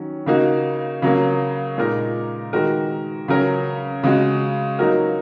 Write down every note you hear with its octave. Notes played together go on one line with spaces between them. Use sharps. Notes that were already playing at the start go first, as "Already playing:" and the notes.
Already playing: D#3 F#3 C#4
C#3 A#3 D#4 F#4
C#3 F#3 A#3
A#2 G#3 D#4 A#4
D#3 G#3 F#4 A#4
C#3 F#3 C#4 A#4
C#3 G#3 F#4
F#3 A#3 D#4 F#4 A#4